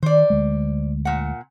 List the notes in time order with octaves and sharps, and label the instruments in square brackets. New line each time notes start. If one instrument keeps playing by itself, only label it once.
[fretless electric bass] D#3 [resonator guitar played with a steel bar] C5 D5
[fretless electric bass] D2 G#3
[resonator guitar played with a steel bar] A#2 F#5